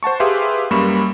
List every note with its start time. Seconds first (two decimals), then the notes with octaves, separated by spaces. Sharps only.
0.03 C5 F#5 A5 C#6
0.20 G4 G#4 B4 E5 F5 C6
0.71 F#2 G3 A#3 B5 C#6 E7